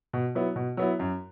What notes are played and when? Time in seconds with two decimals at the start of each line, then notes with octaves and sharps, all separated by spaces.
0.13 B2
0.35 F#3 B3 E4
0.56 B2
0.77 F#3 B3 E4
0.99 F#2